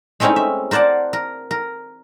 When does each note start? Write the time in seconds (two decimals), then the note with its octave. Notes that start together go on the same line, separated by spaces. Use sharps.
0.20 G#3 A3 C4 C#4 D#4 E4
0.36 E5
0.71 A#4 C5 D5 F#5 A5
1.13 A#4
1.51 A#4